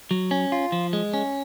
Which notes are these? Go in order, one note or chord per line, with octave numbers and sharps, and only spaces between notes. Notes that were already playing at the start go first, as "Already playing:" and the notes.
F#3
C#4
F4
F3
G#3
C#4